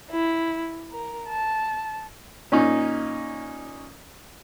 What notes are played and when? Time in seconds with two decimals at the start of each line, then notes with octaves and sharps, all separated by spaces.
0.11 E4
0.92 A#4
1.29 A5
2.52 A#2 C#4 D#4